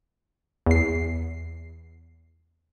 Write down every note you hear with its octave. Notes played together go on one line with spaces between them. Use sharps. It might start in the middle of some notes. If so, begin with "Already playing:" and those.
E2 C7